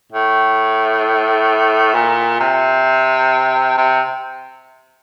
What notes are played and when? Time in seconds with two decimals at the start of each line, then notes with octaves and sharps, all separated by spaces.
0.13 A2
1.95 A#2
2.40 C3
3.78 C3